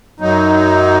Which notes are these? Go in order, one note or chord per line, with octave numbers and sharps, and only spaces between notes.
F#2 F#3 D#4